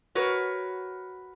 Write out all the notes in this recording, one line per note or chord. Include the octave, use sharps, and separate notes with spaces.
F#4 A#4 B4 C#5